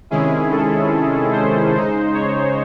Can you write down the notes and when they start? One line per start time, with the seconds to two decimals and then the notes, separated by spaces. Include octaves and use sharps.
0.10 C3 D#3 G#3 C#4 E4 G#4
0.51 A4
1.32 C5
1.73 C#3 G#3 D#4
2.14 C#5